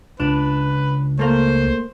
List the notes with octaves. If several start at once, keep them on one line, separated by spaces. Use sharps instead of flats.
C#2 D4 B4
A3 A#3 C5